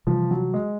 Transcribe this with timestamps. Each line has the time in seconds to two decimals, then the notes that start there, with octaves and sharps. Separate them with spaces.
0.07 C3 E3 F3 G3
0.31 F#3
0.54 G#3